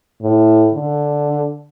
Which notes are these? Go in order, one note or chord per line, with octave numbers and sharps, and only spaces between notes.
A2
D3